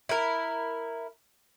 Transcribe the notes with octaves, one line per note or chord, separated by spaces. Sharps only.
E4 A#4